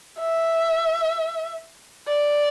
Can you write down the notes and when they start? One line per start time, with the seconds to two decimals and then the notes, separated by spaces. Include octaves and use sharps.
0.19 E5
2.08 D5